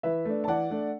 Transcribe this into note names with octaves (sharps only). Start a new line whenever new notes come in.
E3 B4 E5
A3 D4
A5
E3 D5 F#5
A3 D4